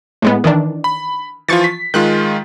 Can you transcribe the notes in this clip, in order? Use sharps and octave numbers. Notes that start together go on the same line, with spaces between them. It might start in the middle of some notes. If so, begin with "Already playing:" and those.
A2 G#3 B3
D#3 E3 D4
B5
E3 F3 F4 C#6 A6
B6
D#3 G#3 F4 F#6